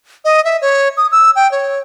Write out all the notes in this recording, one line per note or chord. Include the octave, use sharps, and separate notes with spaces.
D#5
E5
C#5
D#6
E6
G5
C#5